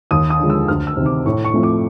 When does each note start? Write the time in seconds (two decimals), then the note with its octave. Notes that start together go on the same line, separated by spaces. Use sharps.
0.11 D#2 D#6
0.30 D#6
0.39 D3 F3 G#3
0.50 E6
0.68 D2 F6
0.87 E6
0.97 C3 D#3
1.06 D6
1.26 A2 C#6
1.45 C#6
1.54 F3 A3 C4
1.63 D6